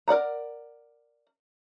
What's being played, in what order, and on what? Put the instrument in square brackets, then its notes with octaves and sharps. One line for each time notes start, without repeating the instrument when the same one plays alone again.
[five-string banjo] A#4 D5 F#5 A#5